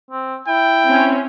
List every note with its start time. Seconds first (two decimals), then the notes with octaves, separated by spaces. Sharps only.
0.11 C4
0.48 E4 G5
0.88 C4 C#4